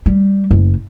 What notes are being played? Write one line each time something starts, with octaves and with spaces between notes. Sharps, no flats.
G3
F#1